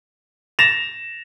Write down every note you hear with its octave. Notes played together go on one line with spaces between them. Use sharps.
A6 A#6 E7 F7